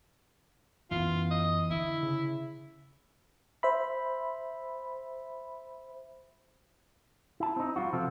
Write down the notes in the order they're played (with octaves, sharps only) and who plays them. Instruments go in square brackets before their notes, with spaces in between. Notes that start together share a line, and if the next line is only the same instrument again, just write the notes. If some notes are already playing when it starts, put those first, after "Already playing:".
[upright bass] F#2 B3 [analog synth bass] E3 [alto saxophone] F4
[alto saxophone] D#5
[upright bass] D3 [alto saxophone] E4
[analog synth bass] C#3
[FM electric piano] C5 E5 B5
[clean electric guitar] E4 A5
C4 D#4
G3 F4 F#4
C3 F3 C4 F4 A4